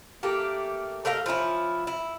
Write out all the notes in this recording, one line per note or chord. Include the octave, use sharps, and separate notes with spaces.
A3 A#3 G4
A3 A#4 D#5 F5
F3 C#4 D#4 E4
E4